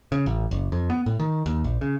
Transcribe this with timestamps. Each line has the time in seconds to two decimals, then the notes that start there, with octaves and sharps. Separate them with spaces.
0.12 C#3
0.26 A1
0.51 F#1
0.72 F2
0.90 B3
1.06 A2
1.20 D#3
1.46 D#2
1.64 A#1
1.81 C#3